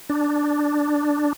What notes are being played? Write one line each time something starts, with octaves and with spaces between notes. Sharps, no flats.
D4